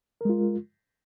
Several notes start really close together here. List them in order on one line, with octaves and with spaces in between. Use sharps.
A#4 G#3 F4